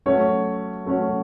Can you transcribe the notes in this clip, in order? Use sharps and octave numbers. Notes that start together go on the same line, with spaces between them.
F#3 A3 C#4 F#4 C#5
F#3 A3 C#4 F#4 C#5